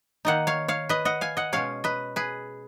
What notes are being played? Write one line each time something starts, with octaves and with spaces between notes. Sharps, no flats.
D#3 A#3 D#4 D#5 F#5
C#5 F5
C#5 F5
B4 D#5
D#5 F#5
F5 G#5
D#5 F#5
B2 G#3 C#4 C#5 F5
B4 D#5
G#4 B4